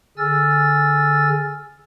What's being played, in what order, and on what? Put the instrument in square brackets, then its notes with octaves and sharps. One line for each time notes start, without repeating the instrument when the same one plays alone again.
[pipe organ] D3 G#4 G#5 E6 F6 A6